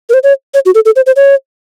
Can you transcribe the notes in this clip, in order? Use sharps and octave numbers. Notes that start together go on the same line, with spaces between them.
A#4
C5
C#5
C#5
F#4
A4
A4
C5
C5
C#5